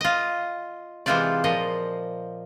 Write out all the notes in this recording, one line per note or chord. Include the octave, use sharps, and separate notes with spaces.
F4 D#5
C3 E3 G#3 F4 C5 D5
A#2 F3 D#5